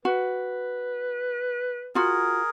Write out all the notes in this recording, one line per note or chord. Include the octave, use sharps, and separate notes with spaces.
F#4 B4
F4 F#4 G#4 A#4